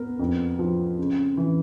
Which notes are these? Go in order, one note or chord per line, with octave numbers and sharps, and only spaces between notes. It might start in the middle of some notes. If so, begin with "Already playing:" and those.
Already playing: B3 A#4
F2
F3
C#3
E3